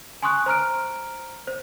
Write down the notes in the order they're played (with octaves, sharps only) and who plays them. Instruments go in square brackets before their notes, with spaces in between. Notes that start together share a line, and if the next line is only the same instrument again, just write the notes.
[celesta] G#5 C6 C#6 D#6 F#6
C5 A#5 F6 D7
C5